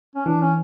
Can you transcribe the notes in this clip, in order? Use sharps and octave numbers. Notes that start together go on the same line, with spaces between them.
C#4
E3 D4
C#4